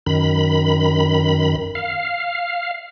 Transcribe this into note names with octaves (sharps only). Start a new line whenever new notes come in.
F#2 D#3 B5
F5